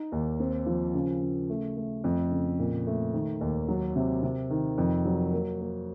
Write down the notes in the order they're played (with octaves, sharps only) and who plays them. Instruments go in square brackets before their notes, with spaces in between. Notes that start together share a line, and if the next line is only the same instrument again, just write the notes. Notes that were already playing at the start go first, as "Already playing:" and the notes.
Already playing: [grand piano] D#4
D#2
C4
F3
C#3
C#3
A3
A3
F2
C#3
A#2
A3
D#3
D#2
F#3
C3
C3
D#3
F2
F#3
A#3
A#3